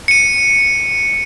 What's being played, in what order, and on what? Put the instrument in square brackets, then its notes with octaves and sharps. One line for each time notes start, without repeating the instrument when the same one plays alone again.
[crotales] C#7 D#7